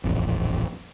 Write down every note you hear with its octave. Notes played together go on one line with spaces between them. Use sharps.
D#1 A1 F2